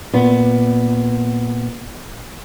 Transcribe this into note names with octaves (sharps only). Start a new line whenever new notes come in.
A#2 B3